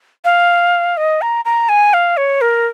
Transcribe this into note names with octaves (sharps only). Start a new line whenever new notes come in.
F5
D#5
A#5
A#5
G#5
F5
C#5
A#4